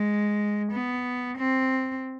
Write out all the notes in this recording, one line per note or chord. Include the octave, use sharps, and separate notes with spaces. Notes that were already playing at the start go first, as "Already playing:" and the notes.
Already playing: G#3
B3
C4